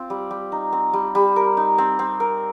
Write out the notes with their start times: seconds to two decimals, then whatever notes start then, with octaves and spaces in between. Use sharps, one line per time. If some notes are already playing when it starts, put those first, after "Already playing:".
Already playing: C4 F4
0.10 G3
0.31 G3
0.52 D#4
0.73 C4
0.93 G3
1.15 G3
1.36 A#4
1.57 D#4
1.78 C4
1.99 C4
2.20 A#4